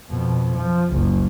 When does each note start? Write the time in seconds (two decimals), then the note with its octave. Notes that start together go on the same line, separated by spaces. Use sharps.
0.10 F2 B2
0.56 F3
0.92 F#1 C#2